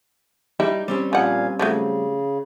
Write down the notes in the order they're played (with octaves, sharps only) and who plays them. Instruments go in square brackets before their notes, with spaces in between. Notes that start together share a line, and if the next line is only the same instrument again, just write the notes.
[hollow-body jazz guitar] G3 D#4 G4 [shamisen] E4
[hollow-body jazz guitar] G3 C4 C#4
[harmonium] A#2 F5 G#5 [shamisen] F3 F#5
[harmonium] C#3 [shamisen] F3 F#3 A3